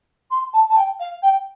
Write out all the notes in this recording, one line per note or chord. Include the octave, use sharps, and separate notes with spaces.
C6
A5
A5
G5
F5
G5